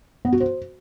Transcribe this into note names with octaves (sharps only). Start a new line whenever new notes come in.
B3
F#4
C5